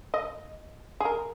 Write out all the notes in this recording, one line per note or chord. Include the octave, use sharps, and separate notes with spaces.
D#5
G#4
A#4